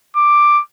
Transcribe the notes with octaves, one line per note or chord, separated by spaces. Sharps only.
D6